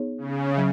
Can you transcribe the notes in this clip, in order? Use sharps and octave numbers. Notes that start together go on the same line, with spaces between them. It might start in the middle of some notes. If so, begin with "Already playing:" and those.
Already playing: B3 D#4 G#4 C#5
C#3
F#3